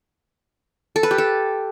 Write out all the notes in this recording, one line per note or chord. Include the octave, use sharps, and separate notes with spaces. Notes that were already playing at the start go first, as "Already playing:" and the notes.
A4
B4
G4
A4